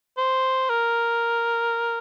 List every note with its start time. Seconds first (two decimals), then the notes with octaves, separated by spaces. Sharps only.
0.18 C5
0.69 A#4